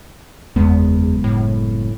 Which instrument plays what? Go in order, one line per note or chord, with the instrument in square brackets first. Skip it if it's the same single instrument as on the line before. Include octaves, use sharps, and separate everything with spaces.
[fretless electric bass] F#1 G#3 B3 [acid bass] E2
[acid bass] A2